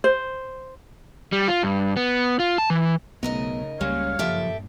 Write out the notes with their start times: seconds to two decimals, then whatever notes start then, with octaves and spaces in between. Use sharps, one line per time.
0.04 C5
1.32 G3
1.48 F4
1.63 G2
1.97 B3
2.39 F4
2.58 A5
2.70 E3
3.23 B1 C#3 A3 B3 D#4 A#4 D#5
3.81 C#2 G3 G#3 A#3 C#4 C#5 F5
4.19 F#1 G2 A#2 F3 G4 A4 E5